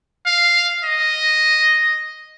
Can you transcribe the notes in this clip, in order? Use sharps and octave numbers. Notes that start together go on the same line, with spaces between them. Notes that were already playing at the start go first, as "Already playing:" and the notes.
F5
D#5